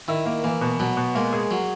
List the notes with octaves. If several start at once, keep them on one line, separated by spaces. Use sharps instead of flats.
D#3 E4
A#3
E3 A#3
B2
B2 F#3
B2
G#3 A#3
G#4
F#3